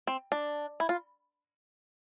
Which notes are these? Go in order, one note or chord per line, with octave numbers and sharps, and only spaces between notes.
C4
D4
E4
F4